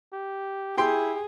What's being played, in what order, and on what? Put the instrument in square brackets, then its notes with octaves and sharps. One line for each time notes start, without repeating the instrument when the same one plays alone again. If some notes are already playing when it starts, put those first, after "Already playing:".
[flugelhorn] G4
[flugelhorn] E4 [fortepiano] G4 G5 C6 [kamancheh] G#4